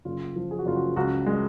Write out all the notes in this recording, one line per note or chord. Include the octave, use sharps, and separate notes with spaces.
F#1 F4
F3
G#4
F#4
F#1 F4
F#4
C#2 F#4
G#3